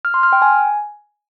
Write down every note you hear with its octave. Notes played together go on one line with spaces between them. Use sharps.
F6
C6
F6
G5
G#5